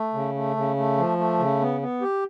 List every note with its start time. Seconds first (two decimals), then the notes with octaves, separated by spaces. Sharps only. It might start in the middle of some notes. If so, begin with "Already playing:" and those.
Already playing: A3
0.14 C#3
0.35 A3
0.56 C#3
0.76 A3
0.97 F3
1.18 A3
1.39 C#3
1.60 B3
1.81 B3
2.02 G4